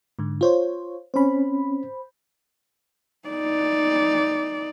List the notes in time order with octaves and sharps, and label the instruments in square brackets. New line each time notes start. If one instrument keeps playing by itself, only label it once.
[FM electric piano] G#2 D3
F4 C5 C#5
[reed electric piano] C4 C#4 [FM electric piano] C5 B5
[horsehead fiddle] D#4 D5